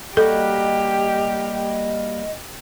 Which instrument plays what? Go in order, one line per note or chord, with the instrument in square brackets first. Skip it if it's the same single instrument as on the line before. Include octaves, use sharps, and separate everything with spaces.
[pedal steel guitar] G3 A#3 F#4 [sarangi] G4 [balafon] A4 [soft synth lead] D#5